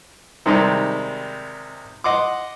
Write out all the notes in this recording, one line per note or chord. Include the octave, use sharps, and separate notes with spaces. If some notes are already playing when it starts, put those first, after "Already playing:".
C3 D#3 G3 G#3 D#4
D#5 F#5 C6 D6